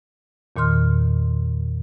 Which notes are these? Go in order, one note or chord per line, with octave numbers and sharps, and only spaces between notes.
E2 A#2 D#3 C6 F6